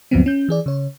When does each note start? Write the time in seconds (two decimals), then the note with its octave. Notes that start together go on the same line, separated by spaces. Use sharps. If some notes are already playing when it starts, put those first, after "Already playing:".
0.11 D2 G2 F3 F#3 B3 C4
0.26 C#4 G6
0.49 E3 G#4 D5
0.66 C#3 C#5